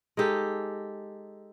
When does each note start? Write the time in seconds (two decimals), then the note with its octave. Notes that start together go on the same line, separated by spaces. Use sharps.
0.17 G#3 D#4 G4 A4